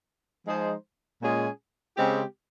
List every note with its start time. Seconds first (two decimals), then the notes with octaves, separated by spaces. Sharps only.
0.47 F3 G#3 D#4 G#4 C5
1.22 A#2 G#3 C#4 F4 G#4
1.97 C#3 G#3 C4 G4